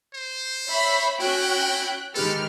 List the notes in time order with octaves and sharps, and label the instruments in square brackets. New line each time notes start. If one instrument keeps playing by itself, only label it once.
[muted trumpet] C5
[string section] C#5 E5 B5
[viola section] C#4 F#4 [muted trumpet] E4 [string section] G5 F#6
[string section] D#3 F6 [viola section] G#3 G4 B4 [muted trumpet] A4